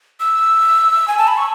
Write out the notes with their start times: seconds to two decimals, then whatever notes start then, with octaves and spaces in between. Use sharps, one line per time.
0.20 E6
1.08 G#5
1.18 A5
1.28 B5
1.37 C#6